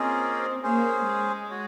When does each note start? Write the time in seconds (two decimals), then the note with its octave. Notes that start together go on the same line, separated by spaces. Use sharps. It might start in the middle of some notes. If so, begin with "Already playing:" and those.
Already playing: A#3 C4 C#4 F4 G#4 D#5
0.63 A#3 C#4 G#4 C5
1.07 G#3
1.50 F#4 C#5